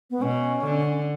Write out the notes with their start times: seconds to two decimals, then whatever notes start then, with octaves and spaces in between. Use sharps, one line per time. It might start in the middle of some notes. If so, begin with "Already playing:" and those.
0.10 B3
0.21 B2 C#4
0.65 D3